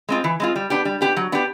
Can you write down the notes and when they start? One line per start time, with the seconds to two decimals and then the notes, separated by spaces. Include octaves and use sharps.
0.09 G#3 C4 F4
0.24 E3
0.40 G#3 C4 F4
0.56 G3
0.70 B3 D4 G4
0.85 G3
1.01 B3 D4 G4
1.17 F#3
1.32 B3 D4 G4